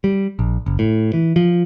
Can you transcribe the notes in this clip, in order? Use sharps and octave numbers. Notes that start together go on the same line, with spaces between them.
G3
A#1
F#1
A2
E3
F3